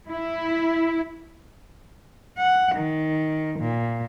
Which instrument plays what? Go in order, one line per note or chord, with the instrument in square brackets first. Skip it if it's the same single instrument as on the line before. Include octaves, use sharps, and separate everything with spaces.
[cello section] E4
[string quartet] F#5
D#3
A#2